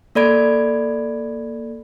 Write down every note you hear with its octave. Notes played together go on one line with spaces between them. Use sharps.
A#3 A4 D5 B5 G#6 D7